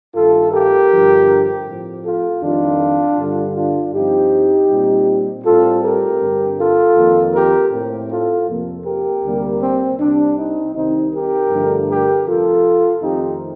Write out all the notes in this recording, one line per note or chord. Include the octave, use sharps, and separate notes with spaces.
G2 D#3 A3 F4 A4
G4 A#4
G2 D3 F3
A2 F3 C4
F4 A4
F2 D#3 G3 D4 F4
G2 D3 G3
D4 F4
G2 F3 C4 D#4 G4
A#2 G3 C4
A2 G3 C4 F4 A4
G4 A#4
G2 D3 G3 C4
F4 A4
F2 D#3 A#3
G4 A#4
A2 A3 C4
F4 A4
F2 C3 F3 A#3
G4 A#4
D2 C3 G3 A#3
C4
C2 C3 G3 D4
C4 D#4
C2 C3 D#3 C4 D#4
G4 A#4
G2 D3 F3 A3
G4 A#4
F2 C3 F3 F4 A4
F2 D#3 A3 C4 D#4 G4